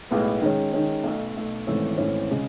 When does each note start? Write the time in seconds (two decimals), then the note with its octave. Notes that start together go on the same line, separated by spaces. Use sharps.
0.11 B1 A2 G#3 B3
0.42 D#3 G#3 C#4
0.73 D#3 G#3 C#4
1.03 B1 B2 A3
1.36 B1 B2 A3
1.67 G#1 G#2 E3 A3 C#4
1.98 G#1 G#2 E3 A3 C#4
2.31 C#3 G#3